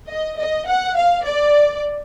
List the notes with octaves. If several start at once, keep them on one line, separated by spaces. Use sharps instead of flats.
D#5
D#5
F#5
F5
D5